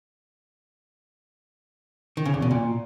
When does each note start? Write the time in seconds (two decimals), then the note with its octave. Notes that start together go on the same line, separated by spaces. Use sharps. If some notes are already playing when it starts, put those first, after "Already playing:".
2.17 D#3
2.25 C#3
2.34 E2
2.42 B2
2.51 A#2